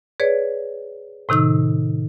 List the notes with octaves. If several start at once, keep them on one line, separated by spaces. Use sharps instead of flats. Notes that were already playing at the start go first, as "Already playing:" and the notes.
G#4 B4 C#5 D5
A2 C3 D#3 D#4 E6